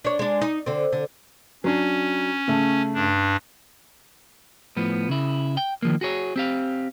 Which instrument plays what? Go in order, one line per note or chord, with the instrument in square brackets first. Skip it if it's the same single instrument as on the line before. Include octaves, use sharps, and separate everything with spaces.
[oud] D4 C#5
G#3 D4
D#4
D3 C4
D3
[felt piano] F#3 D4 [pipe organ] C#4
[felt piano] C#3 A3
[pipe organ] G2 D4
[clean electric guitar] A2 F3 B3
C#3 E4
G5
D#3 F3 A#3
F#4 G#4 C#5
C4 G4 F5